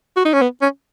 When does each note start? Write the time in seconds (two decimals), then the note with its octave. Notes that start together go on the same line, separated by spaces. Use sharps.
0.17 F#4
0.25 D#4
0.33 C#4
0.42 B3
0.62 C#4